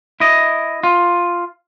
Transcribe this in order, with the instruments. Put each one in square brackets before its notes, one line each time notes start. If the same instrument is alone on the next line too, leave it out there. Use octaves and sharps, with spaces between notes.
[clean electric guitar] E4 D#5
F4